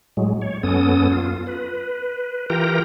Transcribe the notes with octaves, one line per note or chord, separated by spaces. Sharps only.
A2 F#3 G#3
C#5
F#2 B3 C#4 A4 D#6
F4
B4
E3 F4 G4 A#4 G5 A#5